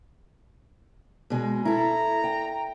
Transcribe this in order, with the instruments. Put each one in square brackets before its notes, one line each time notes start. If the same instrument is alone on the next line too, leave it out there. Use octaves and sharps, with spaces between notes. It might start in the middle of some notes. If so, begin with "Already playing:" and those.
[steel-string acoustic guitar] B2 G#3
[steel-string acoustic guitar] E4 A4 [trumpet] A#5
[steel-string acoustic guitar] G5